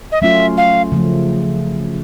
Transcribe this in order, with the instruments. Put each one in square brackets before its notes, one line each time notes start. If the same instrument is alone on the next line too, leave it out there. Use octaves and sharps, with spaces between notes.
[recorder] D#5
[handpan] F#3 A3 C#4 F4 [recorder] E5
[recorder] F5
[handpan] C#3 F3 A3